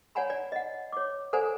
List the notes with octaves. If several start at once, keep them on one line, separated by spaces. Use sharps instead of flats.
C#5 D5 F#5 G#5 A#5 B5
D5
D#5 F#5
C#5 D6
A4 C5 D5 F#5 G#5 A#5